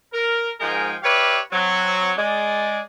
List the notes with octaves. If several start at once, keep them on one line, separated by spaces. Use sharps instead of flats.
A#4
G#2 F3 G#3 A#4 G5 G#5
G4 B4 C#5 D5 E5 F5
F#3 C4 F#4
G#3 D5